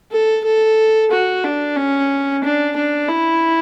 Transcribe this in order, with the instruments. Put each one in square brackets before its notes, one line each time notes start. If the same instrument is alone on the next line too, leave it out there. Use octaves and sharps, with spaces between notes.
[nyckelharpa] A4
A4
F#4
D4
C#4
D4
D4
E4